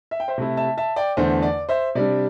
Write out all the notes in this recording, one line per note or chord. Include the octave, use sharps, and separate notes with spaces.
E5
G5
C5 E5
C3 A3 E4
E5 A5
E5 A5
D5 G5
E2 D3 A3 C5
D5
C5 E5
C3 G3 D4 D5